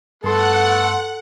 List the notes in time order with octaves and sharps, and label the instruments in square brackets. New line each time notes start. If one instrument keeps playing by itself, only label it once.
[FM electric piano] G2 C6 [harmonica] A3 B3 [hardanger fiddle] A4 [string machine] F#5